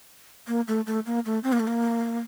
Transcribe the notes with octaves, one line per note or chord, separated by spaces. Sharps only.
A#3
A3
A3
A#3
A3
C4
A#3
A3
A#3